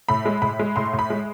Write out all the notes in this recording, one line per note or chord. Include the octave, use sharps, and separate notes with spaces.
A2 B5
G#3
A2 B5
G#3
A2 C6
A2
B5
G#3